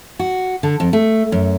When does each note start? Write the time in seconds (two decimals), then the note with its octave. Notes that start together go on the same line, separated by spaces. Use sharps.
0.19 F#4
0.63 D3
0.80 F2
0.93 A3
1.32 F#2